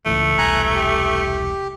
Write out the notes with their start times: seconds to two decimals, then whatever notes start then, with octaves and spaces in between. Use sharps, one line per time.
0.06 C#2 A2 E3 A3
0.38 E1 C2 G#5 A#5 F#6
0.75 G4